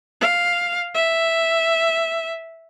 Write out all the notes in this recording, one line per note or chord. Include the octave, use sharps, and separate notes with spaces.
F5
E5